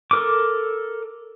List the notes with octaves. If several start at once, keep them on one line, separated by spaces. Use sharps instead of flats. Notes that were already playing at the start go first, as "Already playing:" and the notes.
A4 A#4 D6